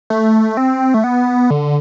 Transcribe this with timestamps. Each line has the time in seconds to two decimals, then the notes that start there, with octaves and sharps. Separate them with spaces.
0.10 A3
0.57 C4
0.94 A3
1.04 B3
1.50 D3